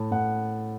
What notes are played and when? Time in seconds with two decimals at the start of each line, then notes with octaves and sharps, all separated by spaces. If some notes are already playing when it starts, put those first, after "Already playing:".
Already playing: A2 A5
0.11 A2 F#5